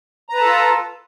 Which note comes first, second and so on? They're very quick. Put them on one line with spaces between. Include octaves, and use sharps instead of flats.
A#5 B4 A5 A4 F4